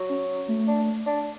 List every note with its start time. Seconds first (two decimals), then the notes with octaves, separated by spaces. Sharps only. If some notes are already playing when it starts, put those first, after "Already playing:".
Already playing: F#3
0.09 C#4
0.48 A3
0.67 D4
1.06 D4